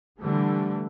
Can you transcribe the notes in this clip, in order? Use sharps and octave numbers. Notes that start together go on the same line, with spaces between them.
D3 E3 G3 A3